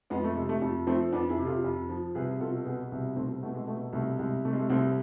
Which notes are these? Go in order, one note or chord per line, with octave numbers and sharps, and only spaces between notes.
F2 G#3 B3
A3
C3 G#3
A3
F2 A3
F3 A3 C4
F2 B3 D4
E4 G#4
C3
F4 A4
F2
F3
C2 G#4 B4
B2 F4 A4
B2 G#4 B4
C2
C2 A3 C4
B2 A3
G#3
B2 A3
C2 A3
C2 G#3
C3 A3
G#3
A3
C2 A3 C4